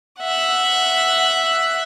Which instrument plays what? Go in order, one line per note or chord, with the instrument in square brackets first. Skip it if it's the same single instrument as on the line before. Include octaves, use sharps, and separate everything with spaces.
[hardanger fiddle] E5 F#5